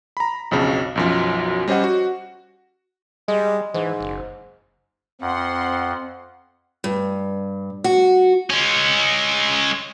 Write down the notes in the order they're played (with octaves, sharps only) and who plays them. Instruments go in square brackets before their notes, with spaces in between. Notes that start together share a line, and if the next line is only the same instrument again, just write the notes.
[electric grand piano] A#5 B5
B1 F2 C#3
B1 F#2 F3
G3 C#4 C5 D#5 F#5
F#4
[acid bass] G3 [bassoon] G#3
[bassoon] G#2 [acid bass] E3
[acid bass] F#1
[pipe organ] F2 [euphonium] C4 [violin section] F#5 C6
[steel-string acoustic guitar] G2
F#4
[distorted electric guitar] G#3 C#4